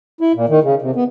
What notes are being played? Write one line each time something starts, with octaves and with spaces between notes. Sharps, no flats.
E4
A#2
D#3
C#3
C3
B3